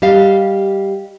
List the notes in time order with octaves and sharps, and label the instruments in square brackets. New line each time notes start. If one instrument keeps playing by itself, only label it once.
[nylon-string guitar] G3 G4 D#5 F5